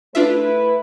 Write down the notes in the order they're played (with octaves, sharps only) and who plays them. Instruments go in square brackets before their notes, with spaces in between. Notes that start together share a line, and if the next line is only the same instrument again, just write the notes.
[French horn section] A3 E4 B4 [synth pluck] D4 F4 E5